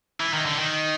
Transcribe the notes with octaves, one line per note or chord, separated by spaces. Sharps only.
E3
D#3
D3
D#3